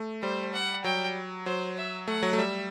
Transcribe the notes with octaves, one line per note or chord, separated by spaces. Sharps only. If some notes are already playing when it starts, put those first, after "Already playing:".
Already playing: A3
G3 C5
F#5
F#3 G5
F#3 C5
E5
A3 F#5
F#3
A3
G3 E5